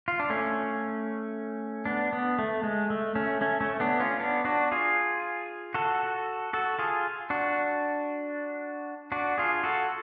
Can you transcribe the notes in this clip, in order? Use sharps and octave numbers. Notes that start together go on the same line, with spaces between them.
F4
D4
A3 C#4
B3 D4
B3
A3
G#3
A3
A3 C#4
A3 C#4
A3 C#4
B3 D4
C#4 F4
B3 D4
D4 F#4
F4 G#4
F#4 A4
F#4 A4
F4 G#4
D4 F#4
D4 F#4
F4 G#4
F#4 A4